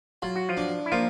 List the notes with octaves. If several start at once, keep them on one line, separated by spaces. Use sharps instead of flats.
F#3 F4
F#4
F3 F4
D4
E4
F3 A#3 F4